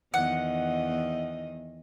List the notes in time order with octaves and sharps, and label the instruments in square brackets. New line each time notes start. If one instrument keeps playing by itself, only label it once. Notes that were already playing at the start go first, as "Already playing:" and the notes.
[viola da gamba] E2 D#3 D#5 [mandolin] F#5